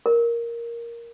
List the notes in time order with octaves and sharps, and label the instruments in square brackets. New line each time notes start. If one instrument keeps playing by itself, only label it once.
[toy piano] A#4